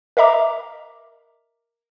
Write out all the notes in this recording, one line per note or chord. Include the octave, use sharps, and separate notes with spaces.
A#4 D#5 E5 A#5 D6